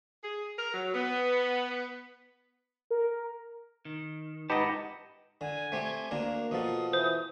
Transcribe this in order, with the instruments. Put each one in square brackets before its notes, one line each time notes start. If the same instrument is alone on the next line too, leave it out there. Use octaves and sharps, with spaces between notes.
[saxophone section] G#4
A#4
F#3
B3
[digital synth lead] A#4
[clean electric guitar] D#3
[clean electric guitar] G#2 F#5 A5 [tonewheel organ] D#4 B4 [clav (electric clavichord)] G4 D#5
[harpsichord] D3 [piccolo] G#5
[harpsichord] A3 C4 G4
[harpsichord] D2 D4 A#4 [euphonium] A#3
[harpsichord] B2 F3 A4 [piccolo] D#6
[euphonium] E3 [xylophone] C5